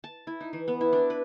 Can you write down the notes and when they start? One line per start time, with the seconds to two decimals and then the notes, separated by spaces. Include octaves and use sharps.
0.04 A5
0.27 E4
0.41 D#4
0.53 E3
0.68 B3
0.81 E4
0.93 D4
1.10 B4